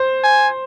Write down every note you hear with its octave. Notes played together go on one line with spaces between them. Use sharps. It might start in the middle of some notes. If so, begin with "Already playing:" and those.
Already playing: C5
G#5